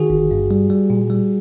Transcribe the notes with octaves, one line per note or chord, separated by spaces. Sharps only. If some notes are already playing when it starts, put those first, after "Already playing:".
Already playing: D#3 F#4 G#4
G1
G2
G3
G3
A#2
G3